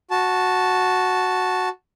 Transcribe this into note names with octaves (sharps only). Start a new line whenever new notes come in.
F#4 A5